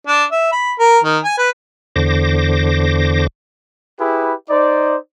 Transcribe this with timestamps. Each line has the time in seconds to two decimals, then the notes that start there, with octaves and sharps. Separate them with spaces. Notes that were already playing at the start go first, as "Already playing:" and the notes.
0.07 D4
0.32 E5
0.52 B5
0.79 A#4
1.04 D#3
1.24 G#5
1.38 B4
1.96 E2 D3 C5 D6 A#6
3.99 E4 G4 G#4 B4
4.50 D#4 C5 D5